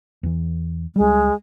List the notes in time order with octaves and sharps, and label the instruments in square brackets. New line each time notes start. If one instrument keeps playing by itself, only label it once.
[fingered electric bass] E2 E3
[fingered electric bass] C#2 G3 [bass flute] G#3